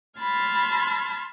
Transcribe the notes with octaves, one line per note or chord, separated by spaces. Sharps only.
A5 B5 C6 F6 G#6 A6